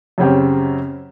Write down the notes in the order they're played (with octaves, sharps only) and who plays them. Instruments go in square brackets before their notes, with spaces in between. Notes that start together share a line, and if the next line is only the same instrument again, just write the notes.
[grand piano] F#2 C#3 C4 C#4 G4